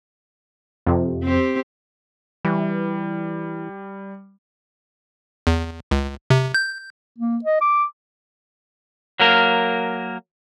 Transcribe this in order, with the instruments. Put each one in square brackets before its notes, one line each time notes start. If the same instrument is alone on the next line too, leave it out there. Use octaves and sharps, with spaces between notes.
[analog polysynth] F2 C3
[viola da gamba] C4 G4
[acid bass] E3 [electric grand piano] G3
[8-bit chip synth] E2
C#2
C3
G6
[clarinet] A#3
D#5
D6
[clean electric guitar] F#3 A#3 A#4